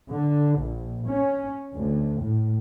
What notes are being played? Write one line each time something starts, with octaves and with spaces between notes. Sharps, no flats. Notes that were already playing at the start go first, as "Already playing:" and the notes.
D3
A#1
C#4
D2
A2